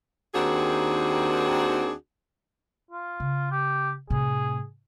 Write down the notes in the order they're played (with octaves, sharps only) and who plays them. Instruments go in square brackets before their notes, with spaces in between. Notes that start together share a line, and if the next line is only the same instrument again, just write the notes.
[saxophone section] D#2 D#3 C4 D4 F#4 G#4
[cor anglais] F4
[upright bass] C#3
[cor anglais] G4
[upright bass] A2 C3 [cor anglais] G#4